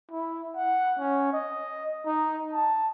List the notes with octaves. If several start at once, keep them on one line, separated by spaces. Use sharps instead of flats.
E4
F#5
C#4
D#5
D#4
A5